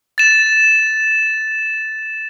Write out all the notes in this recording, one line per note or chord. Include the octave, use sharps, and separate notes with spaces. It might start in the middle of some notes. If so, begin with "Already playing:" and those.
A6 E7